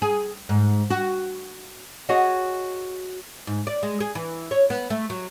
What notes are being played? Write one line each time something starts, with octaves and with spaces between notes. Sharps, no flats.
G#4
G#2
F#4
F#4 G#4 C#5 D#5 F#5 G#5
G#2
D5
G#3
G#4
E3
C#5
B3
A3
F#3